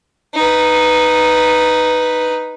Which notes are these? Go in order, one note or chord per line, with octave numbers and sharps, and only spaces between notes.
D#4 B4